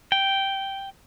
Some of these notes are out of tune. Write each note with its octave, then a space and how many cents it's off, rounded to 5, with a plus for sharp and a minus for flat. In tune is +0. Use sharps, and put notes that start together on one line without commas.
G5 -5